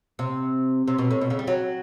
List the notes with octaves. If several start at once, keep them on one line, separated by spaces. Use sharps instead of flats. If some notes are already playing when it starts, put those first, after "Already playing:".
C3
C3
B2
A2
B2
C#3
G3
F#3